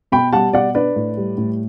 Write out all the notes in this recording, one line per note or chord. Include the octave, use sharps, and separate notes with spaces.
B2 G5 B5
G3 F#5 A5
B2 D5 F#5
D4 B4 D5
A2
G3
A2